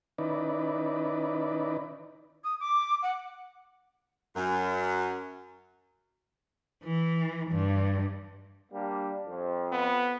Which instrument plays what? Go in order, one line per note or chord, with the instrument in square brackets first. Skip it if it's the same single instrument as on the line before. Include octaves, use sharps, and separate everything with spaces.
[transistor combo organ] D#3 C#4 D#4 E4 B4 D5
[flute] D#6
D6
F#5
[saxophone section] F#2
[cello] E3
G2
[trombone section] G3 A#3 D4
F2
[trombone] B3